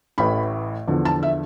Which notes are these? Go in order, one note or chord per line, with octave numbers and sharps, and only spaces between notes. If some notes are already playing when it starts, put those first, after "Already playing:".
A1 A2 E3 B5
E2 D3 F3
A5
E5